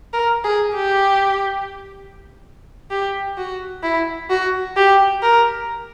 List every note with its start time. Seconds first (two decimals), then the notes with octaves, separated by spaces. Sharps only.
0.13 A#4
0.44 G#4
0.75 G4
2.91 G4
3.37 F#4
3.83 E4
4.30 F#4
4.76 G4
5.22 A#4